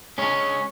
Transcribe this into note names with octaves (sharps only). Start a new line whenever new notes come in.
G#3 C#4 C#5